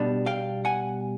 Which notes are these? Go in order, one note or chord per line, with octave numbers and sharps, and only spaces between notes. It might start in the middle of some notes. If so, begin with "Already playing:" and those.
Already playing: B2 G3 B3 D4
F5 G5
F#5 G#5